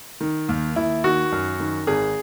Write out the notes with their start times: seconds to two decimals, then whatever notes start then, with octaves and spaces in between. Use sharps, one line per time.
0.20 D#3
0.49 D#2
0.76 D#2 E4
1.04 D#3 F#4
1.32 F#2
1.59 D#3
1.87 G#1 G#4